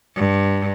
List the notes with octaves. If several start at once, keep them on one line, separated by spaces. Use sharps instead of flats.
G2